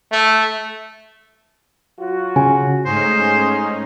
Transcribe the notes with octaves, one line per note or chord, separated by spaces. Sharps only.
A3
F#3 F4 F#4
C#3 G#5
G#2 A3 C#4 D#4 G#4 C5